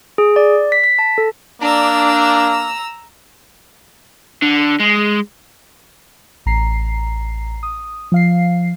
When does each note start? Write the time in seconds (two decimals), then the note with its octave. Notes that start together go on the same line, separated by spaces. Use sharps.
0.18 G#4
0.36 D5
0.72 B6
0.84 B6
0.99 A5
1.18 A4
1.62 A#3 D4 A#5 E6
4.42 D3
4.80 G#3
6.46 A1 A#5 C7
7.63 D#6
8.12 F3 F5 C7